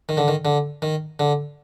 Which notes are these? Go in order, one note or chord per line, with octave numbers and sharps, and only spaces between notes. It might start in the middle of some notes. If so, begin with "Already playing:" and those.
D#3
D3
D#3
D3
D#3
D3